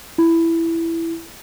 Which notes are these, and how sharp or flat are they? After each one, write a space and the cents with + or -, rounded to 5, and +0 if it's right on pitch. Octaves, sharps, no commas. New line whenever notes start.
E4 +10